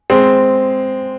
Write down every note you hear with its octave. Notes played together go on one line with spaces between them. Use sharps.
G#3 C4